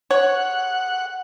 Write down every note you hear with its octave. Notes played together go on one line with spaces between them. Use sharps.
C#5 F#5